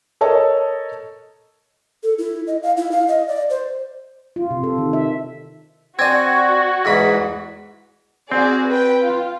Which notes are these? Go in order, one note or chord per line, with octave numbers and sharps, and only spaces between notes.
A4 A#4 C#5 D#5 A5
A4
E4
D#5
F5
E4
F5
D#5
D5
C5
F4
C3
A4
D#3
E5
C4 F#4 D5 G#5 G#6
E2 G#2 B5
C4 F#4 G#4 D5
B4 G5
F4